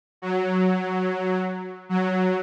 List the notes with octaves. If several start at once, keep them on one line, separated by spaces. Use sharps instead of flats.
F#3
F#3